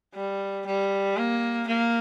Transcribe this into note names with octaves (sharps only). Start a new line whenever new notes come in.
G3
G3
A#3
A#3